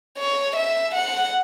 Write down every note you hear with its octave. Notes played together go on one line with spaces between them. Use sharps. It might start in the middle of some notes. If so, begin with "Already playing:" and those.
C#5
E5
F#5